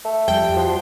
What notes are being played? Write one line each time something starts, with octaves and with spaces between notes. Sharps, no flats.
A3
F2 G3 G5
F3 F#4 C5